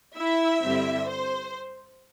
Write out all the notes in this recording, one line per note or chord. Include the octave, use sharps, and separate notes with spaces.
E4 E5
G2 D3 G3 C4 E4
C5